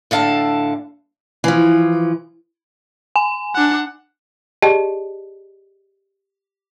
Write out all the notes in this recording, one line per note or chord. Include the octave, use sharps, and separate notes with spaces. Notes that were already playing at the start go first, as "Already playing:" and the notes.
A2 D3 F5 A5
E3 F3
G#5
D4 F#5
G4 G#4 D5 D#5 G5 A5